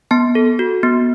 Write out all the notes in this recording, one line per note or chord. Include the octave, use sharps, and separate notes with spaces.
B3 A5
A4
F#4
B3